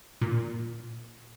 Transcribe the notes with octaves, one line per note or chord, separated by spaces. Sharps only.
A#2